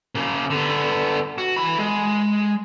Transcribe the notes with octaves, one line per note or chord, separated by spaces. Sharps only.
C#3 A#3
D3 B3
F#4
E3 B5
G#3